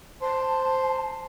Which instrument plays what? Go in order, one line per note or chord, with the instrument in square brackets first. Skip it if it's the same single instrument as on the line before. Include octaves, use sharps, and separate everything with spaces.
[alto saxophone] C5 [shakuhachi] A5